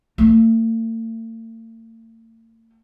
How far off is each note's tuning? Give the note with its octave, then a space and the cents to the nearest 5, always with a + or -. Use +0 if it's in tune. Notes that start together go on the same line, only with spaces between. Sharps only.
A3 +45